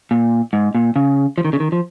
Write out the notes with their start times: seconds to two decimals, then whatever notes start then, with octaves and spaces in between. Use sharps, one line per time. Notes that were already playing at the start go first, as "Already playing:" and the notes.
0.11 A#2
0.53 G#2
0.75 A#2
0.96 C#3
1.38 F3
1.45 D#3
1.53 C#3
1.60 D#3
1.72 F3